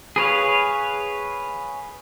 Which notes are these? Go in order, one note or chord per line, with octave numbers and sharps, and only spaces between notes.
G#4 B4 C#5 F5